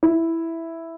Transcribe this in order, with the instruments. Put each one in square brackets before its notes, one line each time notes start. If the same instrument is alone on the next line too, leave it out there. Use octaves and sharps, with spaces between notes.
[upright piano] E4